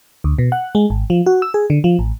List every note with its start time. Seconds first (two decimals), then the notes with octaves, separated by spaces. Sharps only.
0.24 D2
0.38 B2
0.52 F#5
0.75 G#3
0.90 G#1
1.10 F3
1.26 F#4
1.42 E6
1.54 G#4
1.70 D3
1.84 F3
1.99 A1